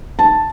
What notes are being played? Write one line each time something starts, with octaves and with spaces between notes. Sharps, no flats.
A5